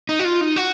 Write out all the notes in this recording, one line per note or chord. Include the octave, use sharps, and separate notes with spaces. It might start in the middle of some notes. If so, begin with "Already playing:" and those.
D#4
F#4
F4
D#4
F#4